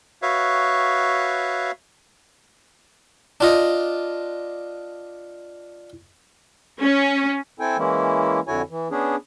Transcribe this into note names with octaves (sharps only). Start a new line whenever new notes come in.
F#4 B4 C#5 E5 F5
D4 F4 D#5
C#4
C4 E4 A4 G5 G#5
E3 G#3 A#3 C#4 E4
F2 D3 E4 F#4 C#5 G#5
E3
B3 C#4 D4 G#4